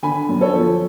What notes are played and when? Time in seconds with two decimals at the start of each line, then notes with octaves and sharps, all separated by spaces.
0.03 D3 G#5 B5
0.29 F#2
0.41 A4 C#5
0.54 F3